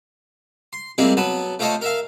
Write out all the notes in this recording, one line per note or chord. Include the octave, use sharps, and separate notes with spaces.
C6
G3 G#3 A#3 C4 E4 F4
F#3 B3 B4 A5
A3 F4 C5 C#5 D#5 A5
A#4 E5 F5